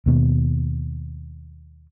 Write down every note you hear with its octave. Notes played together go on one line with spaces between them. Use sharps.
D#2 B2